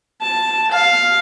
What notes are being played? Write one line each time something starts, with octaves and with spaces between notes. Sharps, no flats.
A5
F5